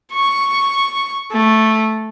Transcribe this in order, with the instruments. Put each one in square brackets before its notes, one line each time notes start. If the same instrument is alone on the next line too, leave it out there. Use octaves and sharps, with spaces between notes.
[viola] C#6
A3